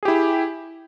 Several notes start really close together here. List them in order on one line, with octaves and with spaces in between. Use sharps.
G#4 G4 E4